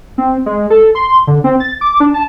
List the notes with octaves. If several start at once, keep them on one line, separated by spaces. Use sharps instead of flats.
C4
G#3
A4
C6
D3
C4
A6
D6
D4
A5